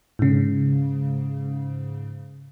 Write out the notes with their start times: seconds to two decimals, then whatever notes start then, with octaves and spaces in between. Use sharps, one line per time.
0.19 G#2 C#3